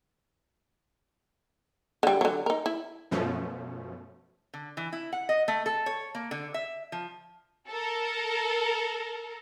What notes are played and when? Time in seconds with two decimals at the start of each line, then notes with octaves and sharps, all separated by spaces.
2.03 D3 G3
2.21 D3 F#3
2.46 D#4 A#4
2.66 E4
3.11 F#2 B2 F3 A3 C#4
4.54 D3
4.77 E3
4.92 E4
5.13 F#5
5.29 D#5
5.48 A3
5.66 A4
5.86 C#5
6.15 A#3
6.31 D3
6.54 E5
6.92 F3
7.68 A4 A#4